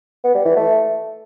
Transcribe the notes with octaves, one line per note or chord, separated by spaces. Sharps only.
B3
G3
E3
A3